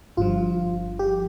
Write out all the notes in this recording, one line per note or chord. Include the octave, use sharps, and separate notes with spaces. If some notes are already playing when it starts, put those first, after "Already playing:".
G1 G2 F3 F4
G4